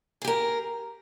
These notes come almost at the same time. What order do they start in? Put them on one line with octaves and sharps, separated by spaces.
G#4 G4 A#4